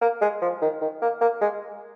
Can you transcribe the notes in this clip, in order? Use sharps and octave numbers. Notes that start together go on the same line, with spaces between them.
A#3
G#3
F3
D#3
D#3
A#3
A#3
G#3